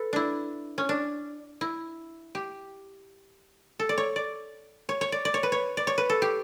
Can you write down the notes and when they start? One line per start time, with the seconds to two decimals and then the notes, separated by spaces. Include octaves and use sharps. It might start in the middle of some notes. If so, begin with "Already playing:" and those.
Already playing: A4 B4
0.13 D4 E4
0.78 C#4
0.89 D4
1.61 E4
2.35 G4
3.79 A4
3.89 D5
3.98 C#5
4.16 D5
4.89 C#5
5.01 C#5
5.12 D5
5.25 D5
5.34 C#5
5.43 B4
5.52 C#5
5.77 D5
5.87 C#5
5.98 B4
6.10 A4
6.22 G4